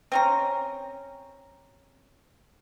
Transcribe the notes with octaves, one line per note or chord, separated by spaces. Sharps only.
C4 C#4 A#5